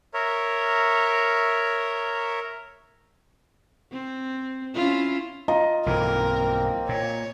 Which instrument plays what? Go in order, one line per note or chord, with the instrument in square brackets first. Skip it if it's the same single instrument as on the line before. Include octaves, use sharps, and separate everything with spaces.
[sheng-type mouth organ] A#4 C#5 E5
[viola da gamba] C4
C#4 E4 F4
[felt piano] F4 D#5 A#5
[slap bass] B1 G2 E3 [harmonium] A#3 C4 [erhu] A#4
[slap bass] A#2 [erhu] C#5